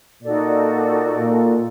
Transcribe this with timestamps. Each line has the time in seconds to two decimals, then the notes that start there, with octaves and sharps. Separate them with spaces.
0.23 A#2 D#4 F#4 A4 D5
1.16 A#2